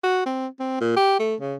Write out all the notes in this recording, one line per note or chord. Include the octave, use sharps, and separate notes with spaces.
F#4
C4
C4
A#2
G4
A3
C#3